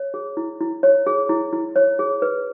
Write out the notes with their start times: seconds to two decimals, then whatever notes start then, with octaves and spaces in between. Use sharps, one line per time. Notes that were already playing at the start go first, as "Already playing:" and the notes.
Already playing: C#5
0.14 G#4
0.37 E4
0.61 E4
0.83 C#5
1.07 G#4
1.29 E4
1.53 E4
1.76 C#5
1.99 G#4
2.22 B4